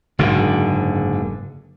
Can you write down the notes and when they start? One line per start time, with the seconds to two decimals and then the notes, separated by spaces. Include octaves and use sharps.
0.19 F#1 G#2 D3